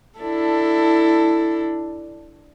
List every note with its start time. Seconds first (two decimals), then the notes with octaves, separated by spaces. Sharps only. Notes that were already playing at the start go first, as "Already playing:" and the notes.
0.19 D4 E4 A4